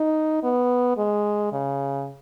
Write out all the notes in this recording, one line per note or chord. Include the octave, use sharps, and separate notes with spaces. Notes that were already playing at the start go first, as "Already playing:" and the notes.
Already playing: D#4
B3
G#3
C#3